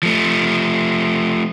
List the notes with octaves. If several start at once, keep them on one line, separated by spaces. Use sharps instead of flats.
F3 A3